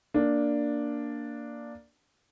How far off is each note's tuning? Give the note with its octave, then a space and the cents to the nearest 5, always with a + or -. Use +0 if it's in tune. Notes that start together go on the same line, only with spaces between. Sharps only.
A#3 +0 D4 +0